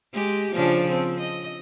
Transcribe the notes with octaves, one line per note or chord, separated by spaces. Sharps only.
G#3 G4
C#3 F3 D4
C4
D#5